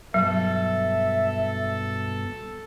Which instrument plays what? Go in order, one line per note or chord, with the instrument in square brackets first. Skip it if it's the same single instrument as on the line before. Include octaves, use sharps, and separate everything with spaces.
[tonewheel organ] G2 B2 [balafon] F#3 [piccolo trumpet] A4 [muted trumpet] E5